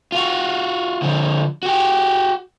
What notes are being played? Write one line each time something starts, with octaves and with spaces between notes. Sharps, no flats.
F4 F#4
D3 F3
F#4 G4